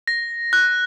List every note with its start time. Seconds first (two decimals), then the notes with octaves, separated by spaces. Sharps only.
0.08 A#6
0.53 F#6